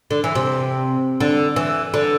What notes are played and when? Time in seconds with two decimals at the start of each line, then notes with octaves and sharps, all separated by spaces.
0.11 D3
0.24 E3
0.35 C3
1.20 D3
1.56 E3
1.94 D3